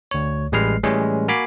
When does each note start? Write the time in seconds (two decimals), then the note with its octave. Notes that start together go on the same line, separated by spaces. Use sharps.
0.11 D2 C#5
0.52 A1 G3 G#3 B4 F6 C7
0.83 A2 E3 G3 G#3 C#4
1.28 A#3 F#4 G#5 B5 D6 C7